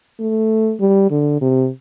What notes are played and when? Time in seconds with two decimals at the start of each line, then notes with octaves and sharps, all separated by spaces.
0.20 A3
0.80 G3
1.11 D3
1.41 C3